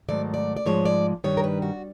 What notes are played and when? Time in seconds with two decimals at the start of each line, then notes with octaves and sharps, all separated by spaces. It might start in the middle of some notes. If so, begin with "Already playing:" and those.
0.08 G#2 D#3 F#3 A3 D5
0.34 D5
0.57 D5
0.66 G#2 F3 G#3 C#5
0.85 D5
1.24 G2 D#3 G3 C#5
1.37 A#4
1.44 B4
1.62 F#4